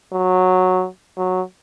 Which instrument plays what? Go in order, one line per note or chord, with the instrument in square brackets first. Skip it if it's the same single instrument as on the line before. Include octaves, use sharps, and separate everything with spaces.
[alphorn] F#3
F#3